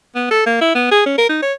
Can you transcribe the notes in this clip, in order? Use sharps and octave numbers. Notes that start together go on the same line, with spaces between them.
B3
A4
A#3
E4
B3
G#4
C#4
A#4
D#4
C#5